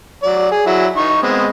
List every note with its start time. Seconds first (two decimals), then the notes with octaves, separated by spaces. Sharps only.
0.23 F#3 D5
0.51 G#4
0.67 F#3 E4
0.97 D#4 C#6
1.23 G#3 B3 C4